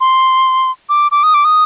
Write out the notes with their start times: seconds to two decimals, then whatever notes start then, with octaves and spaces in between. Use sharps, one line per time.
0.01 C6
0.89 D6
1.12 D6
1.23 D#6
1.34 D6
1.45 D#6